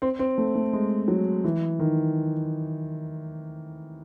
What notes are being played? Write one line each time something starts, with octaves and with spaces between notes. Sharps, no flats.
C4
C4
A3
A3
G#3
F#3
E3
D#3